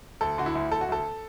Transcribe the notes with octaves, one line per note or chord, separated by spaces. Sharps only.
D2 A4
D3 F#4
E4
D2
D2 A4
F#4
D2 A4